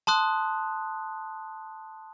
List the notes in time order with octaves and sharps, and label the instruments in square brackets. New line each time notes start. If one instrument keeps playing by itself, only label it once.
[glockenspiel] A5 C6 D#6 F#6